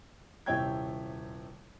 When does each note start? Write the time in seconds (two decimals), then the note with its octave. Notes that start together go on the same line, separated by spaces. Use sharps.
0.46 D#1 C3 E4 C#5 G5 G#6